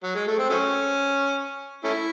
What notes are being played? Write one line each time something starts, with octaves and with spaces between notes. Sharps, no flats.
F#3
G#3
A3
C4
F#3 A3 C#4
A3 C#4 E4